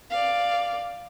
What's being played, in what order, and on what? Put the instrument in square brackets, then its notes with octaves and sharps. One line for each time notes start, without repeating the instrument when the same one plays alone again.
[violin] D5 F5